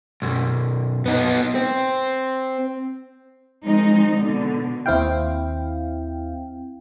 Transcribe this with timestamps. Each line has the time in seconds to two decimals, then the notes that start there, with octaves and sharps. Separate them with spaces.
0.22 B1 F#2
1.06 B3 D#4
1.55 C4
3.65 D#3 F3 G#3 C4 D#4
4.12 B2 D3
4.86 D#2 C4 E4 F5 G5